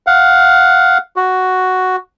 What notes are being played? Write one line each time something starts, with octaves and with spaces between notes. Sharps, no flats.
F5 F#5
F#4